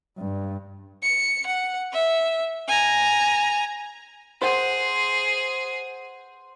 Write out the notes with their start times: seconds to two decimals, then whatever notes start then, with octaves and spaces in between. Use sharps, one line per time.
0.18 G2
1.02 C#7
1.47 F#5
1.93 E5
2.68 G#5 A#5
4.42 G#4 C5 F#5